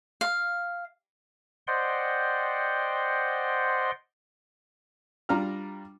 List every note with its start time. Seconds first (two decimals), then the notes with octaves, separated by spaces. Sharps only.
0.21 F5
1.67 C5 D5 D#5 F#5 G5 C6
5.29 G3 D4 F4 A#5 F6